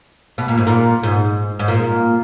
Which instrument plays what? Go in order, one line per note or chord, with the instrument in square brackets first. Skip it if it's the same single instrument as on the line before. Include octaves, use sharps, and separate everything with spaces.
[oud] B2
A#2
G#2
A#2
G#2
G#2
A#2